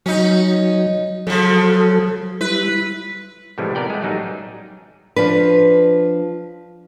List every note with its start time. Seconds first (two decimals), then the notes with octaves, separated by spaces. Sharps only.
0.06 F#3 C#4 D#4
1.27 C#3 F3 F#3 A4
2.41 G3 E4 B4
3.58 A2 C3 E3 F3 G3 G#3
3.75 B3 A#4 D5 G5
3.90 G#3 A3
4.02 A1 F#3 G3 D#4
5.16 F3 D4 B4